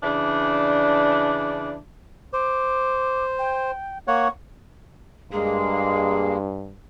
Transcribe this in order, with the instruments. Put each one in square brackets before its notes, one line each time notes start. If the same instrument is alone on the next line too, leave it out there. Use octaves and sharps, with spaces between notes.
[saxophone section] C#3 E3 D4
[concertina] C5 [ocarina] D6
[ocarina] G5
[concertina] A#3 C#5 F#5 [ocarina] C#6
[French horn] G2 [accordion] G#3 A#3 [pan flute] G#4